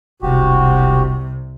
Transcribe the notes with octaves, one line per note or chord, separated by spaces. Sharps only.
E1 C2 C3 F#4 G4